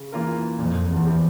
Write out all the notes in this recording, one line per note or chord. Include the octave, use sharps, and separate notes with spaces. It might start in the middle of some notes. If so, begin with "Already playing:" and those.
Already playing: C#3
E3 A#3 F4 A#4
F2 A#2
E2
F3 C4 G4